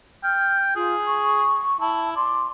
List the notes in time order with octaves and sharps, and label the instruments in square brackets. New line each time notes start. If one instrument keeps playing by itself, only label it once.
[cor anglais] G5 [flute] F6
[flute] F4 [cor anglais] G#4
[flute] C#6
[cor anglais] E4 [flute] A5
[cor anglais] D5 [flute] C6